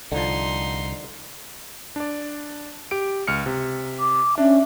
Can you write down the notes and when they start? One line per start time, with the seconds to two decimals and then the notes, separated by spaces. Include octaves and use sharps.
0.12 C2 D3 F3 D#4 C6
1.96 D4 D5
2.91 G4 D7
3.27 C#2 F6 C#7
3.46 C3
4.00 D6
4.38 C#4 D4 E5